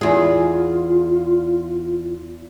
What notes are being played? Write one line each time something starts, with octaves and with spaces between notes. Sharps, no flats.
E2 F4 G#4